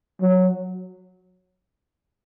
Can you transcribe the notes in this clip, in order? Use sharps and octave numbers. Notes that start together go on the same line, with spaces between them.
F#3